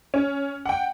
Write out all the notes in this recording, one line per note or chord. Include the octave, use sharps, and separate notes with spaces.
C#4
F#5 G5